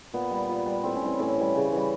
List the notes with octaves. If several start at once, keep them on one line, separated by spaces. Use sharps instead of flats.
A#2 B3
G3
A#2
G3
A2 C4
C#4
E3 G3 C4
A2 C#4
E3 G3
C#3
E3 G3